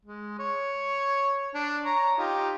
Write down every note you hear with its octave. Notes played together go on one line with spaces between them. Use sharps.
G#3
C#5
D4
C#5 A#5
D#4 F4 G4